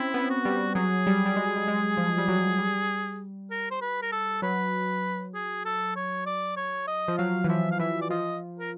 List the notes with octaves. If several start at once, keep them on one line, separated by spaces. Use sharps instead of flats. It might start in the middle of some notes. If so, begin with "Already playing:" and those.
Already playing: C4 C#4 E4
B3
F#4
G3
F#3 G#4
G3
G3
G#3
G3
G#3
F3
G3
F#3
G3
A#4
C5
B4
A#4
A4
F#3 B4
G#4
A4
C#5
D5
C#5
D#5
F3
F#3 F5
E3
F3 E5
F5
E3 E5
D5
F3 D#5
A#4